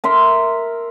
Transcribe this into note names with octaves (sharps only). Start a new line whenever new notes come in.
A#4 E5 C6